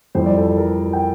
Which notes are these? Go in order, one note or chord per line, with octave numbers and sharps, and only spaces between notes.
F2 E3 G3 C5
D5
A4 C5
G4 A#4
G5